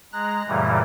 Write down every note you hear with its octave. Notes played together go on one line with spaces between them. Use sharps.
G#3 A#5 F#6 A#6
F#2 A#2 C#3 E3 G3 A3